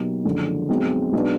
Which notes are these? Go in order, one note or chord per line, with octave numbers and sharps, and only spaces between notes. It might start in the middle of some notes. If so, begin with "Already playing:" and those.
Already playing: B2 F#3 A#3 D#4 G4
F#1 F#2 D3 F3 G#3
B1 B2 G#3 C4
B1 B2 G#3 B3 D4